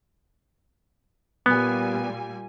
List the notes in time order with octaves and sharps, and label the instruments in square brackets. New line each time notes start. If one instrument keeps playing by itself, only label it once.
[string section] A#2 G3 G#5 [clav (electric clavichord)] B3